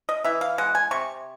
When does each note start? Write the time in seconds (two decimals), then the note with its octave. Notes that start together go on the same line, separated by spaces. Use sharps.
0.09 D#5
0.24 E3 E5
0.41 F5
0.58 G#3 F#5
0.75 G#5
0.91 C3 C#6